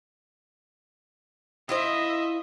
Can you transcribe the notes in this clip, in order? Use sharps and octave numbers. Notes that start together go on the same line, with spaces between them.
E4 F4 C5 D#5 E5